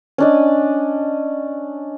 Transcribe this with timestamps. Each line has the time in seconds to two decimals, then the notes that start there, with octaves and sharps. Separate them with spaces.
0.18 C#4 D4 D#5